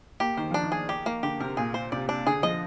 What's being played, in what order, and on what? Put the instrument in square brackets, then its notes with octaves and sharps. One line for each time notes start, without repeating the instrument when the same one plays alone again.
[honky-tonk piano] A#3 [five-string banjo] G4
[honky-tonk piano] D#3 [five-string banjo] C5
[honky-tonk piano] F3 [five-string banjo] D4
[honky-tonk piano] D#3
[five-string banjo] G#4
G4
A#3
[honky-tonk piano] D3 [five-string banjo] G4
[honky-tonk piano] C3 [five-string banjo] A#4
[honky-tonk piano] A#2 [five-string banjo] G#4
[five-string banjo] C5
[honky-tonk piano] C3 [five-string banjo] D5
[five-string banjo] D4
[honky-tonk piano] D3 [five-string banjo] G#4
[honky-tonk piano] F3 [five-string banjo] D#5